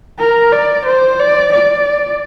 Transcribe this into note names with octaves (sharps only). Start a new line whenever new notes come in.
A#4
D5
C5
D5
D5